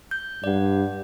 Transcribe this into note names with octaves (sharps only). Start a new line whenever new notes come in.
G6
G2 D5 F#5